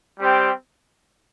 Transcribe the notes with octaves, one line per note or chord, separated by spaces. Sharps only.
G3 C4 G4